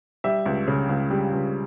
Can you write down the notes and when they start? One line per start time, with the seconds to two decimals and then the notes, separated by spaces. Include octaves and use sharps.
0.24 G3 E5
0.46 C#2
0.67 C#3
0.89 C#2
1.10 G3
1.33 C#2